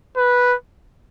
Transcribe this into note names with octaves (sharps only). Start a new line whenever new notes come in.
B4